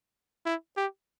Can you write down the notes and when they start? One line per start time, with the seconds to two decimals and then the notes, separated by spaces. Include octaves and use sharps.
0.46 E4
0.77 G4